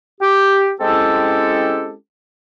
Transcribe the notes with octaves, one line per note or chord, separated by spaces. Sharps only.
G4
G#3 C4 C#4 E4 G4 A4